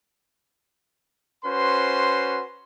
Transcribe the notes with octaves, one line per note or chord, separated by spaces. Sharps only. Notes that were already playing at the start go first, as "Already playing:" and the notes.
C#4 F#4 B4 C5 C6